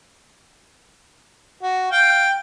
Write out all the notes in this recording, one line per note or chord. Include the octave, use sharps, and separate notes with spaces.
F#4
F5 G5